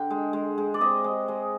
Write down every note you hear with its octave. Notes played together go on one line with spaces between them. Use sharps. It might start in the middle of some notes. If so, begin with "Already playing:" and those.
Already playing: D3 G5
G#3
G#3
G#3
D5
C4 D#5
G#3
G#3